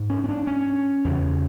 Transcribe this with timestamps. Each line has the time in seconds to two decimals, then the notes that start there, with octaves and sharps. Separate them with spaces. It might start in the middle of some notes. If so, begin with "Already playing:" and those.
Already playing: G#2
0.10 C#4
0.24 C#4
0.29 D4
0.47 C#4
1.05 E2 C#3